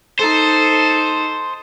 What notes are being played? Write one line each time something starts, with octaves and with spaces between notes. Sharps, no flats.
D#4 A4 C5